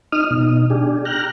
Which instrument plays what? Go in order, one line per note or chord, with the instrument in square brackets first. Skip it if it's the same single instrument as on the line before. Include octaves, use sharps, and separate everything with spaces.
[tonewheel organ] D#4 D#6 F6
B2 D#4
D4 G4 G#4
G5 A#5 F6 F#6